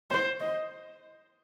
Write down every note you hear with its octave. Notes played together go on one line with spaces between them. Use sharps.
C5
D#5